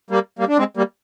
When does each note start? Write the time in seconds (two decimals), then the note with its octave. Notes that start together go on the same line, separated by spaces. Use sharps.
0.10 G3 A#3
0.39 G3 A#3
0.49 D4
0.58 G#3 C4
0.77 G3 A#3